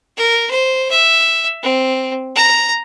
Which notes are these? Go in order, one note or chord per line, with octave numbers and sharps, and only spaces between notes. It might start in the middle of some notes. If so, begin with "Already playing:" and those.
A#4
C5
E5
C4
A#5